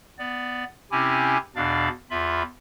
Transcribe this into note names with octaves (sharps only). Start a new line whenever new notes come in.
B3 D5
C3 C4 C#4 E4 G4 G#5
E2 B2 D4 D5 F5
E2 F4 E5 B5